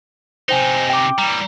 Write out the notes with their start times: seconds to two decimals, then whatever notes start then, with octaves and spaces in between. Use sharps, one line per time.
0.49 C3 D#4 C5 G5 G#5
0.89 G5 D6
1.18 E3 G3 A#5